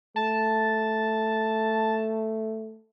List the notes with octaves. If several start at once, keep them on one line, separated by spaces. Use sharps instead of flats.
A3 A5